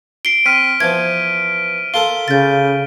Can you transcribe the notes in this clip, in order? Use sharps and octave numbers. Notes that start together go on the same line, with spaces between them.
C7 D7 G7
C4 F6 B6 D#7
E3 F3 B3 C5 G#6
F4 A4 A#4 F5 G7
C#3 G6 A6